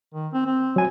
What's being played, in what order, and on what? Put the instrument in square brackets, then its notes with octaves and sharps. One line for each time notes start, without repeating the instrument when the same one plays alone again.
[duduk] D#3
C4
C4
[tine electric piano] F#3 G#5